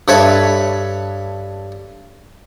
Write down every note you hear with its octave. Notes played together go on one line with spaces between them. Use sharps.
G2 A4 B4 C#5 E5